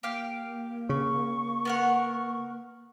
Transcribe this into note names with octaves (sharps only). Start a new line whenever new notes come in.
A#3 G4 F5 G5
C#3 C#6
B3 A#4 F#5